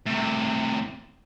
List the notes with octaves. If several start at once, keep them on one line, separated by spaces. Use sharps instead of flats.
A2 C3